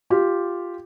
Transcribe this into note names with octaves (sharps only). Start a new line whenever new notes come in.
F4 G4